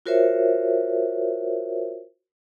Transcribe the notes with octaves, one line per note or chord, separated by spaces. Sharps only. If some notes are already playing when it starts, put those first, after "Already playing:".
F4 F#4 A#4 C5 C#5 E5